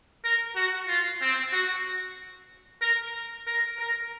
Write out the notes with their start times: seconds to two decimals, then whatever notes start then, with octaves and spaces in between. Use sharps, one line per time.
0.24 A#4
0.56 F#4
0.89 F4
1.21 C4
1.53 F#4
2.82 A#4
3.47 A#4
3.79 A#4